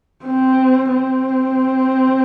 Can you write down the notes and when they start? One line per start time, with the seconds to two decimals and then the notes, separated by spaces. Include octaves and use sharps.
0.25 C4
0.93 C4